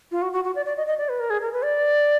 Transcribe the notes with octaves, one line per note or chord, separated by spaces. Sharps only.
F4
F#4
F#4
F#4
D5
D5
D#5
D#5
D5
B4
A#4
G#4
A#4
B4
D5